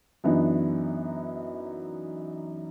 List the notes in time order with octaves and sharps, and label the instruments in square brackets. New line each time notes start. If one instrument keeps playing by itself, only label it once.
[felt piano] F#2 E3 B3 D4 D#4